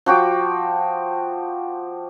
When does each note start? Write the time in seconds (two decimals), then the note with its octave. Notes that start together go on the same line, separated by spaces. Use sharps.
0.06 F3 F#4 G5 D6